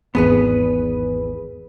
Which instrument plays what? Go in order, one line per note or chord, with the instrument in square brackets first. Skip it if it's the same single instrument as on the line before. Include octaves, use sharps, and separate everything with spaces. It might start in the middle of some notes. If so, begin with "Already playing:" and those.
[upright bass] G#1 [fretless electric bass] E2 [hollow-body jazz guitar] B3 G#4 B4